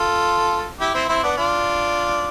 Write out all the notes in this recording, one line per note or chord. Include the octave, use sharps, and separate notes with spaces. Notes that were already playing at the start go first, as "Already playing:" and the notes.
Already playing: F4 A4
E4 G4
C4 E4
C4 E4
B3 D4
D4 F4